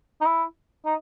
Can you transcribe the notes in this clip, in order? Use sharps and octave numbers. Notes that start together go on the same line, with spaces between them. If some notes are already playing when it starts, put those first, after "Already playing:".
D#4
E4
D#4